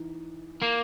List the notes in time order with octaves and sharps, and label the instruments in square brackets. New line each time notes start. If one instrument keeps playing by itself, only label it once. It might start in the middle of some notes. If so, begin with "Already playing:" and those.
Already playing: [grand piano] E3 D#4
[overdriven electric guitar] A#3